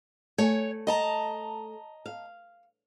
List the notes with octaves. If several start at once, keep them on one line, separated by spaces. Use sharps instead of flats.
A3 C#5 G#5
D#5 A5 A#5
F5